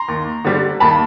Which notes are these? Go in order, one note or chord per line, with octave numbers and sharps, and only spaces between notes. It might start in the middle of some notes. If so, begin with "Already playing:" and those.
Already playing: A#5 C6
D#2
D3 G3
D#2 A5 B5